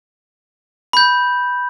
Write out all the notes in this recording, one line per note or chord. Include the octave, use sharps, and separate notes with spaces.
B5 G6